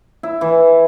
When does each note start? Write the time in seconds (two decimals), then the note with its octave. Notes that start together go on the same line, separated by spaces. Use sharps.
0.23 E4
0.41 E3